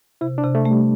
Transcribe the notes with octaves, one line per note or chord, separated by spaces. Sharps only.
C3 E4
D4
C3
A3
A3
G3